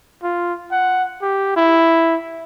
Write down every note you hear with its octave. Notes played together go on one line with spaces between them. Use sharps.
F4
F#5
G4
E4